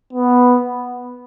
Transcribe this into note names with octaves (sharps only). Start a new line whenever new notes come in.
B3